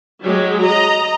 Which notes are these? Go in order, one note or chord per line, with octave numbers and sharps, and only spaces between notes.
F#3 G#3 G4
D#5 A#5